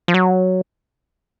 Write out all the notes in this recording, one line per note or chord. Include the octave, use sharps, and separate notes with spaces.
F3
F#3